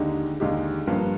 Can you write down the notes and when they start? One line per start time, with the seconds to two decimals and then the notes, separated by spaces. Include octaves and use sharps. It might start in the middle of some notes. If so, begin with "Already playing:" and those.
Already playing: D#2 D3 G#3 D#4 G4
0.40 D#2 D3 G#3 D#4 G4
0.87 G1 G2 F3 A#3